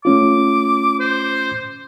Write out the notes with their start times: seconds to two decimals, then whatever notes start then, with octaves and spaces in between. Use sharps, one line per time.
0.05 A3 C#4 F4 D6
1.00 C5